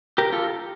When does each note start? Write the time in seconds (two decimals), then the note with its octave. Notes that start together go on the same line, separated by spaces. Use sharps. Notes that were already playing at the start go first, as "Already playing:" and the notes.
0.18 G4 A#4
0.32 F4 A4